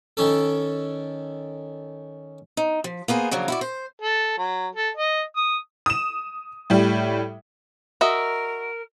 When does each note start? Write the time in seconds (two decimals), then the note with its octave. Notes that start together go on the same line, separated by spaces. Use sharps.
0.17 D#3 C#4 A4
2.57 D#4
2.84 F3
3.08 A#3 B3 G#4 C5
3.31 C#3 F3 F#3 A#3 D4
3.48 E4 F#4 D5
3.61 C5
4.02 A4
4.38 F#3
4.75 A4
4.97 D#5
5.36 D#6
5.86 D#6 E7
6.70 A2 G3
8.01 F#4 A#4 D#5 E5